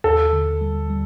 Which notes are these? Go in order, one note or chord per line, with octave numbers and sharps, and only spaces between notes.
D#2 A4
D3
G3
G3